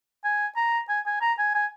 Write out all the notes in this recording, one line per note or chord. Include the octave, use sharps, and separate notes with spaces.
G#5
A#5
G#5
G#5
A#5
G#5
G#5